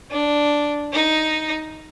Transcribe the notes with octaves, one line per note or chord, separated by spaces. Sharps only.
D4
D#4